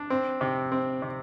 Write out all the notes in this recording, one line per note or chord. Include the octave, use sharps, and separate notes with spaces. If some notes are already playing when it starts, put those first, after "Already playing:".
Already playing: D4
C4
C3
C4
C3